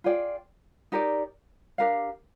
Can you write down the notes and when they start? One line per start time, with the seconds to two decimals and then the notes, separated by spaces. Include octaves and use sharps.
0.04 F4 G#4 D5 G5
0.92 D#4 G4 A#4 D5
1.78 D4 G4 A#4 F5